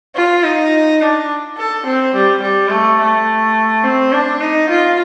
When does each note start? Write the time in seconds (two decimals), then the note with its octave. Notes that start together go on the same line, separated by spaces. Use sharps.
0.16 F4
0.44 D#4
1.01 D4
1.57 A4
1.86 C4
2.14 G3
2.42 G3
2.71 A3
2.99 A3
3.84 C4
4.12 D4
4.41 D#4
4.69 F4